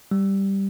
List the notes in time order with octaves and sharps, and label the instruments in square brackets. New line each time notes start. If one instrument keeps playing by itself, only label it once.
[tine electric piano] G3